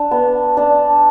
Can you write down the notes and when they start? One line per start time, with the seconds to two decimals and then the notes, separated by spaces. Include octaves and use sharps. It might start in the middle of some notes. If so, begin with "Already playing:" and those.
Already playing: D4
0.11 B3
0.57 D4